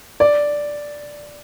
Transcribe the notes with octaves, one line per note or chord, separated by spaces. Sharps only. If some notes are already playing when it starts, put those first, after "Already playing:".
D5